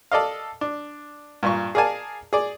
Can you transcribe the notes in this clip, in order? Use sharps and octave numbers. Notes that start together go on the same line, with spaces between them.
A4 D5 D#5 F5
D4
G2 A#2 C#6
G#4 A#4 D5 F5 G#5 A5
G#4 D5